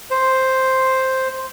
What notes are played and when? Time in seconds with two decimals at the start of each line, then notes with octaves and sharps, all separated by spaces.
0.11 C5